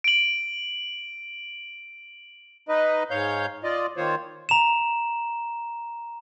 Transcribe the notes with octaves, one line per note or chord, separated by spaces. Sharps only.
D7 F#7
D#4 B4 D#5
G#2 C#5 F5 G6
F4 D5 D#5
D#3 A#3 F4 C5 C#5
A#5 E7